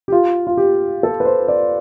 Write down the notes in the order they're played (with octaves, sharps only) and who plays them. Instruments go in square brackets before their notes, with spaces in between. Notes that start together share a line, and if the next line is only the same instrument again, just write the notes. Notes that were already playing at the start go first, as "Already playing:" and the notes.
[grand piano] G4
F4
F4
G4
A4
B4
C5
D5